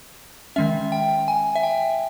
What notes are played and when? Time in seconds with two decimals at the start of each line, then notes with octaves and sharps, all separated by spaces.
0.56 D#3 G#3 C#4 E5
0.92 G5
1.28 G#5
1.55 E5
1.63 G5